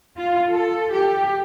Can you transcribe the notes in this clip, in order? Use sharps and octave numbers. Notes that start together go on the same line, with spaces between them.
F4
A4
G4